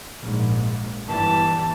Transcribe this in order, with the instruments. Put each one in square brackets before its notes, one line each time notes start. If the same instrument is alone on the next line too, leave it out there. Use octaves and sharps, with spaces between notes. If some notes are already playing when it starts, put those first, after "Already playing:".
[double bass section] A#1 G#2
[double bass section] G1 E3 G3 [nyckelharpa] A5